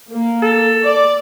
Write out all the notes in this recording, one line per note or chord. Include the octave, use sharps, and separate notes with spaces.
A#3
A4
D5